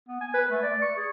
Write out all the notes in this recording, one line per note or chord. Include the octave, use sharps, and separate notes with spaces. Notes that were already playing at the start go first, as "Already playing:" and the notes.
B3
G#5
B4
A3
D5
C#6
G#4